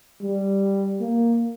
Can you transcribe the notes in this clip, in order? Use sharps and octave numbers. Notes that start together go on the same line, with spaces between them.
G3
A#3